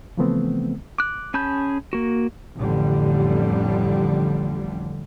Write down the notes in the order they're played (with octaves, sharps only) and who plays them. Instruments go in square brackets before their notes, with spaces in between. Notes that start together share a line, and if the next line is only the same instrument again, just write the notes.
[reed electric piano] C#3 E3 F3 A3 B3 C4
[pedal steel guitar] D6 F#6
C#4 G#4 A5 B5 G6
A#3 F#4
[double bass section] A1 F2 D3 G3